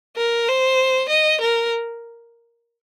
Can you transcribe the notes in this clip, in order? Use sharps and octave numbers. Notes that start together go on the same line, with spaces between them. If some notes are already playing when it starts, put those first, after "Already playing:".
A#4
C5
D#5
A#4